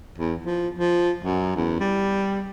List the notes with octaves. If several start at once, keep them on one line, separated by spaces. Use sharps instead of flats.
E2
F3
F3
F#2
E2
G3